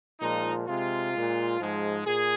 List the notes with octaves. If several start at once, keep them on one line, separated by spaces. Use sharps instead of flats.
A#2 F3 G#3 D#4
C3 G#3 F4
A#2 G#3
G#2 F3 G#3
A#2 G#4